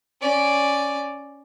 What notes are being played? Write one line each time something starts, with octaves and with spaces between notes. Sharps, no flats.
C#4 D5